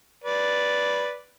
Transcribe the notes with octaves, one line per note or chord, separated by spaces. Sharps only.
B4 D5